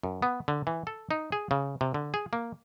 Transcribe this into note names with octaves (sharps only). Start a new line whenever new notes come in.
F#2
B3
D3
E3
A4
D#4
G#4
C#3
C3
D3
G#4
A#3